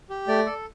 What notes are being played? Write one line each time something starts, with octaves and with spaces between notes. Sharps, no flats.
G4
A3 D5
A4